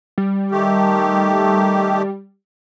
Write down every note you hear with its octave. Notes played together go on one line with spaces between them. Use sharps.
G3
D#3 A3 G4